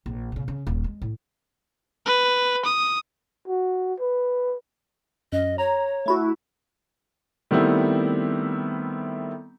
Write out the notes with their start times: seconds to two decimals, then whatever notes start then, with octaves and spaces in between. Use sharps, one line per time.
0.06 A#1
0.32 A#2 C#3
0.48 C#3
0.67 D#1
0.84 G#3
1.02 A2
2.06 B4
2.65 D#6
3.48 F#4
4.00 B4
5.32 F#2 D#5
5.58 C#5 A#5
6.06 A3 E4 F#4
7.51 D#3 G3 A3 B3 C4 E4